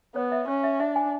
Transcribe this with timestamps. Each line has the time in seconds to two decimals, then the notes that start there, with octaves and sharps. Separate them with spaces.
0.15 B3 C#5
0.32 E5
0.48 C#4 C#5
0.64 E5
0.80 D4 E5
0.96 G#5